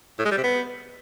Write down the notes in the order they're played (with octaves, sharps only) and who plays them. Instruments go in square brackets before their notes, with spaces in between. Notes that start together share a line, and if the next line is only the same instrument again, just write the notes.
[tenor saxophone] A2
G#3
G3
C3
B3